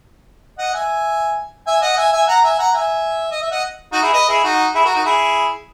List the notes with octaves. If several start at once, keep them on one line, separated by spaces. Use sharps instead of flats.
D#5 F#5
E5 G#5
E5 G#5
D#5 F#5
E5 G#5
E5 G#5
F#5 A#5
E5 G#5
F#5 A#5
E5 G#5
D#5
E5
D#5 F#5
D#4 F#4
E4 G#4
B4 D#5
E4 G#4
D#4 F#4
E4 G#4
F#4 A#4
D#4 F#4
E4 G#4